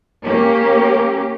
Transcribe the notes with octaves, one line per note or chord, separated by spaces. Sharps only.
A#3 C#4 G4